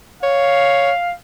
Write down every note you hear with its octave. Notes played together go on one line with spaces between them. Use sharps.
C#5 F5